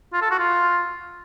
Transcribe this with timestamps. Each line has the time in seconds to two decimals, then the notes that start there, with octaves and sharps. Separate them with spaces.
0.13 F4
0.22 A4
0.31 F#4
0.40 F4